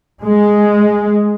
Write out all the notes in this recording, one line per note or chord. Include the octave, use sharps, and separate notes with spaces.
G#3